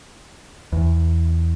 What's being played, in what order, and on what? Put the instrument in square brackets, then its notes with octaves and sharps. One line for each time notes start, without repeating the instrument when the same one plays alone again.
[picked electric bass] E2